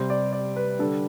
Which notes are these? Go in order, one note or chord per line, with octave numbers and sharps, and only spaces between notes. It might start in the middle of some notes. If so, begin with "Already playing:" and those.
Already playing: C3 G3 C5
D5
D5
B4
D3 G3 A4